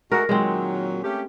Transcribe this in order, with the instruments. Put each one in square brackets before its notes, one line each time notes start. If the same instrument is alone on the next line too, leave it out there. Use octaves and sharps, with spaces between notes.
[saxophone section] G#3 A3 F#4 [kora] A#4
[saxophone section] A#2 D#3 F#3 [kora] G#3 C4
[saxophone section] A3 C#4 G4